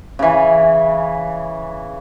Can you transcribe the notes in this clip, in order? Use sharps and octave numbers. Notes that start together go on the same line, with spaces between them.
C#3 E3